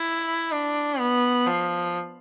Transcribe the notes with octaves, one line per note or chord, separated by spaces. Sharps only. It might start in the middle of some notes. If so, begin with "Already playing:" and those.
Already playing: E4
D4
B3
F3